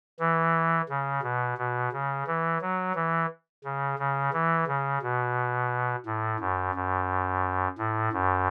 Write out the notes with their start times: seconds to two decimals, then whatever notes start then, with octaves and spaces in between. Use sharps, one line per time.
0.20 E3
0.89 C#3
1.23 B2
1.58 B2
1.92 C#3
2.27 E3
2.61 F#3
2.95 E3
3.64 C#3
3.99 C#3
4.34 E3
4.67 C#3
5.02 B2
6.06 A2
6.40 F#2
6.75 F#2
7.78 A2
8.13 F#2